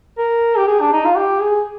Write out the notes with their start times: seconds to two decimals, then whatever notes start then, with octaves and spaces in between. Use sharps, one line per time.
0.18 A#4
0.57 G4
0.67 G#4
0.81 D4
0.92 D#4
1.05 F4
1.16 G4
1.41 G#4